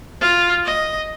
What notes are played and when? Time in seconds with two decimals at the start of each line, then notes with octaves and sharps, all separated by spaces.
0.21 F4
0.65 D#5